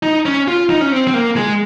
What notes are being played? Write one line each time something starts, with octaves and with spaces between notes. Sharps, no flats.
D#4
C#4
F4
D#4
C#4
C4
C4
A#3
G#3